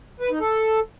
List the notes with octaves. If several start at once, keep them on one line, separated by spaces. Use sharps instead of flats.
B4
D#4
A4